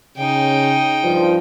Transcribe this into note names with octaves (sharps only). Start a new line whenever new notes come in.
C#3 D#4 G5
G2 F3